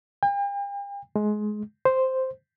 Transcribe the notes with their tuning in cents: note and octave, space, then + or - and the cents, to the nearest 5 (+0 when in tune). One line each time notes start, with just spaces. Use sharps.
G5 +40
G#3 +20
C5 -5